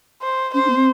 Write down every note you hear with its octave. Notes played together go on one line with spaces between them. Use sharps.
C5
C#4 C5
D4
B3
C4